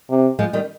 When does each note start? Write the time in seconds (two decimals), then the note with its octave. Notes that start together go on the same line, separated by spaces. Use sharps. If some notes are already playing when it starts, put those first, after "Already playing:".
0.10 C3
0.39 F3 G#3
0.53 D#3 G3